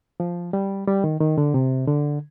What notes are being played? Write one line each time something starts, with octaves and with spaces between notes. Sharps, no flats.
F3
G3
G3
D#3
D#3
D3
C3
D3